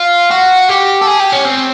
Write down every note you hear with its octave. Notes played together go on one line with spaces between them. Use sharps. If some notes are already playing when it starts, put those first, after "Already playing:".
Already playing: F4
F#4
G4
A4
G#4
G4
C#4
C4